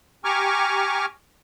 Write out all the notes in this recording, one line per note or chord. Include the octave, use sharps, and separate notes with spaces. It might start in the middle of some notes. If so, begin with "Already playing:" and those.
G4 G#5 A#5 C#6 D6 F6